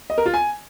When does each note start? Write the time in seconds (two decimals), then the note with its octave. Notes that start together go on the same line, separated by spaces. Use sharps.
0.10 D#5
0.18 A#4
0.26 F4
0.34 G#5